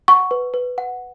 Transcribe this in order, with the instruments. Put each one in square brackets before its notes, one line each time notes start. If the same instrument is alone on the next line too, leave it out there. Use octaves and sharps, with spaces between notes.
[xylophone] F#5 C#6
B4
B4
F#5